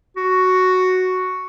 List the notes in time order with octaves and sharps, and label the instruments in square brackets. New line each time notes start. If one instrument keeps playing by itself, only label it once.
[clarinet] F#4